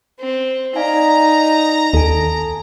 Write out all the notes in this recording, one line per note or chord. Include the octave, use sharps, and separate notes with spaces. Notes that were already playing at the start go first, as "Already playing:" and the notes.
C4
D#4 D5 F5 G#5 A#5
D#2 A4 G#5